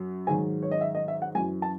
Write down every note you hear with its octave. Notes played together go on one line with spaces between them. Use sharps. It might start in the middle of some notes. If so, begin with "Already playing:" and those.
Already playing: F#2
G#2 D#3 F#3 G#5
C#5
D#5
E5
D#5
E5
F#5
F#2 E3 G#5
A5